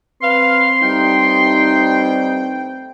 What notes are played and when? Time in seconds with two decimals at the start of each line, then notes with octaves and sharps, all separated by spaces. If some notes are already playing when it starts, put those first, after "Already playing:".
0.22 C4 B4 F5 C6
0.83 G2 G3 A3 D#4 G5